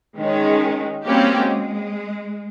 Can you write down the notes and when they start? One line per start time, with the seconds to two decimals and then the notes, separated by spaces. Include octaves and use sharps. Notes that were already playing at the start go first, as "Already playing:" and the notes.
0.18 D#3 G#3 C#4
1.05 G3 A#3 C4 C#4 F#4 G4
1.39 G#3